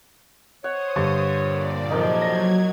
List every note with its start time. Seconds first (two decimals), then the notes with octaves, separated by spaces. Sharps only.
0.64 C5 C#5 F#5 D#6
0.96 G2 D3 C#6
1.36 A#2 D5
1.90 F2 C3 F3 F#3 D#4 A#4 G#6
2.22 A#6